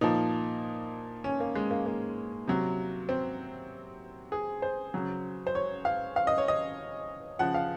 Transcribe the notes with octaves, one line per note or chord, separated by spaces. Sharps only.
A#2 F3 D#4
C#4
A#3
G#3
A#3
A#3
C3 F#3
C4
G#4
C5
C#3 F#3
C5
C#5
F5
F5
D#5
C#5
D#5
C#3 F3 F#5
F5